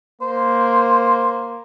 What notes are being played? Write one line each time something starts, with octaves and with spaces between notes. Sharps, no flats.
A#3 C5